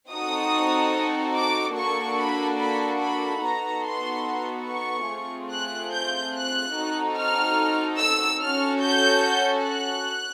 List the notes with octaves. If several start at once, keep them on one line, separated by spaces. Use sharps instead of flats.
C4 D#4 F#4 A4 D#6
D6
A#3 D4 F#4 A4 C#6
B5
B5
B5
B3 D#4 F#4 A4 A#5
C6
C#6
A3 C4 F4 G#4
F#6
G6
F#6
C4 D#4 F#4 A4
F6
E6
C#4 F#4 A4 F6
G6
F#6